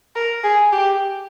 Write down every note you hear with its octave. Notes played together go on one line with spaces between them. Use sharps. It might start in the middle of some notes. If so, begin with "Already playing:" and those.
A#4
G#4
G4